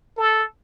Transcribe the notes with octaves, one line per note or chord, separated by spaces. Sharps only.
A4